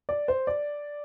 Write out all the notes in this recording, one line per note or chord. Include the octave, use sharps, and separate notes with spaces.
D5
C5
D5